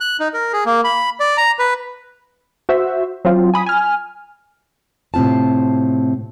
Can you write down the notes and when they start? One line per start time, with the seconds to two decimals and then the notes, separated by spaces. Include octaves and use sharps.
0.01 F#6
0.20 D#4
0.34 A#4
0.53 G#4
0.66 A#3
0.84 B5
1.20 D5
1.37 A#5
1.59 B4
2.69 F#4 C5 E5
3.25 F#3 C4 F4
3.54 G#5 B5 D#6
3.66 G#5 F6
5.14 A2 C3 C4 F4 A5